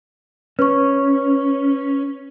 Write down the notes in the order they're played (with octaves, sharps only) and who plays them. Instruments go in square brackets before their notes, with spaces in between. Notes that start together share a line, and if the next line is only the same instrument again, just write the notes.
[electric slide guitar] C#4 [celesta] B4 C#6